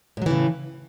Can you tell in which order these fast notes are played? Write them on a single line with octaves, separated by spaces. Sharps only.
A2 F#3 E3 C#3